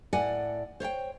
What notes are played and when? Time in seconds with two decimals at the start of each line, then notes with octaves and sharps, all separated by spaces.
0.13 A2 D5 F#5 G#5
0.80 C5 C#5 F5 G5